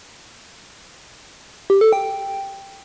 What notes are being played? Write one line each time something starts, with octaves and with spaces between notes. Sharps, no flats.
G4
A4
G5